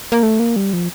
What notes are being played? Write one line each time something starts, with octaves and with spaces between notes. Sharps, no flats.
A#3
A3
A#3
G3
F3